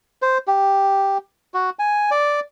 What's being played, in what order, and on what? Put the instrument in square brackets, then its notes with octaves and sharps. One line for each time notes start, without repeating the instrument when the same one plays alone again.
[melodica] C5
G4
F#4
G#5
D5